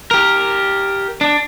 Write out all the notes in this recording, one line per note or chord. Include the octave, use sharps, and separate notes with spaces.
G4 A#4
D4